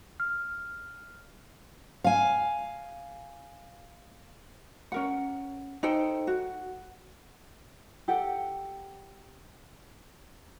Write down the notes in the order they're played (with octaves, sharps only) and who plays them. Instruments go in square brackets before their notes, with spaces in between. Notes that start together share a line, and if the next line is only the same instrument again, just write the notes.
[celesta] F6
[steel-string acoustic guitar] F5 G#5
[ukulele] C#4 A#4 F#5
D#4 A4 C5 G5
F#4
G4 A4 F#5 G5